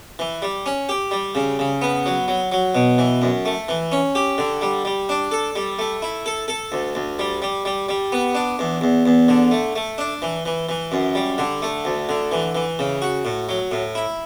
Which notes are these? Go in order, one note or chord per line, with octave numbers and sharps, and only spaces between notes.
E3
G3
C#4
G4
G3
C#3
C#3
B3
F#3
F#3
F#3
B2
E3
F#2
A3
E3
C#4
G4
D3
G3
G3
D4
A4
G3
A3
E4
A4
A4
D2
D2
G3
G3
G3
G3
B3
D4
E2
E2
E2
D3
A3
A3
D4
E3
E3
E3
F#2
G3
D3
A3
D2
D3
E3
E3
C#3
F#4
A2
F#3
A2
E4